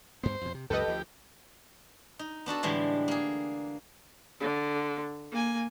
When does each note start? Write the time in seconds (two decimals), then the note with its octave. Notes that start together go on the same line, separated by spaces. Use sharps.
0.23 D2 G2 B3 C5
0.41 F2 B2
0.54 C3
0.70 C#2 F#2 A#2 G4 A4 B4 D#5
0.88 D2 F3
2.19 D#4
2.46 B3 D4 F#4 A4
2.63 A2 D3 E3 G3 G#3
3.08 A#3 G#4
4.40 D3
5.32 A#3 G#5